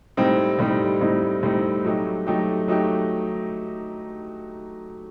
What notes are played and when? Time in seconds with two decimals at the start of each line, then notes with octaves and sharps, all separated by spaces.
0.17 A2 G3 C4 D#4
0.59 A2 G3 C4 D#4
1.01 A2 G3 C4 D#4
1.43 A2 G3 C4 D#4
1.85 F#3 A3 D#4 G4
2.27 F#3 A3 D#4 G4
2.68 F#3 A3 D#4 G4